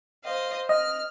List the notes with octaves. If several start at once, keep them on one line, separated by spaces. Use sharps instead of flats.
C5 D#5 F5
D#5 F6